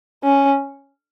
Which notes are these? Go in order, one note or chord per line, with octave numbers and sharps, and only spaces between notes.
C#4